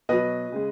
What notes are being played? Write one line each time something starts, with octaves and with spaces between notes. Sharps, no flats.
B2 F#3 B4 D#5
C#3 G#3